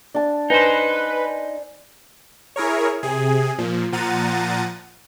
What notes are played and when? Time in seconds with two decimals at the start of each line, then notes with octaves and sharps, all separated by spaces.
0.14 D4 A5
0.50 D#4 B4 C5 G#5
2.56 E4 G#4 A#4 C#5
3.03 C3 G#4
3.58 A#2 F3
3.92 A#2 F3 F#5 A#5 A6 D#7